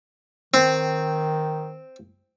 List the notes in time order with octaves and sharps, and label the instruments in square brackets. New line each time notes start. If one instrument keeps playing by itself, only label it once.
[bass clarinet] D#3 [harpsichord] C4